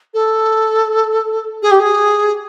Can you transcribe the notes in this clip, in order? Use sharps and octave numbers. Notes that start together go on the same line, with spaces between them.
A4
G#4
G4
G#4